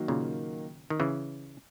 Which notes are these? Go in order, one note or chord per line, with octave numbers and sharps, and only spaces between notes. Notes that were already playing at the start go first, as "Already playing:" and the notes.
Already playing: D#3 F#3 A#3
A#2 C#3
D#3
C#3 E3